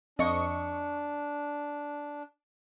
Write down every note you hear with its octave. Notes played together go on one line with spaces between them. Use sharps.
F2 D4 D#5 C#6